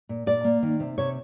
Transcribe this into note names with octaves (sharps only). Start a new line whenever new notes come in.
A#2
A#2 D5
A#3
D#3
C3
C3 C#5